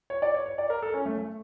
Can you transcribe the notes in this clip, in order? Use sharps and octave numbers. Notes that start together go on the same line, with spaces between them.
C#5
D5
C#5
C#5
D5
A#4
A4
C#4
A3
A3